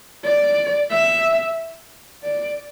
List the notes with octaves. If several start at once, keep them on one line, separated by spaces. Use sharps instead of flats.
D5
E5
D5